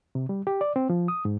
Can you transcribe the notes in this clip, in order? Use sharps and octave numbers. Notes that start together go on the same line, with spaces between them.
C3
G3
G4
D5
C4
F3
D#6
G#2